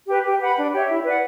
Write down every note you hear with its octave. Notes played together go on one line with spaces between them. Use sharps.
G4 B4
G4
B4 F#5 B5
D4
G4 C#5 E5
E4
B4 D5 F#5